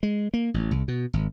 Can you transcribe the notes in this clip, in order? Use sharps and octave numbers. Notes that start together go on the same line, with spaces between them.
G#3
A#3
A1
C2
B2
G#1